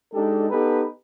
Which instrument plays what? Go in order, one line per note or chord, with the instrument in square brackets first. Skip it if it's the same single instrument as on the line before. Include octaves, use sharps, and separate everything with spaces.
[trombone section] G#3 D4 D#4 G4 A4
B3 D#4 G4 A4 B4